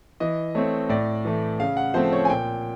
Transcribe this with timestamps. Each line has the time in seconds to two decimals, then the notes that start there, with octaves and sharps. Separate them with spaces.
0.20 E3 D#5
0.55 A3 C4 C#5
0.89 A2 D5
1.25 E3 A3
1.60 C#3 F5
1.77 F#5
1.94 F3 A3 C4 C5
2.13 C#5
2.25 G#5
2.29 A#2 G5